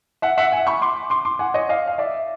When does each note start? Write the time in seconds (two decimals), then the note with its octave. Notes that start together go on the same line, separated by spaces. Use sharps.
0.22 E5 F#5
0.38 E5 F#5
0.52 F#5 G#5
0.67 B5 C#6
0.82 C6 D6
1.10 C6 D6
1.25 C6 D6
1.39 F#5 G#5
1.54 C#5 D#5
1.69 D#5 F5
1.87 F5
1.98 D5 E5